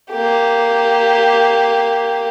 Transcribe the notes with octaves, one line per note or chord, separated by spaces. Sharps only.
A#3 G4